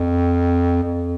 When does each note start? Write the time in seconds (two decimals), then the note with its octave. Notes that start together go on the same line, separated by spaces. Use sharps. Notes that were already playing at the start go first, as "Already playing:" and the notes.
Already playing: F2
0.83 F2